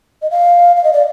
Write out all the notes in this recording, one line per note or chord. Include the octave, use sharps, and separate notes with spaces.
D#5
F5
F5
D#5
D5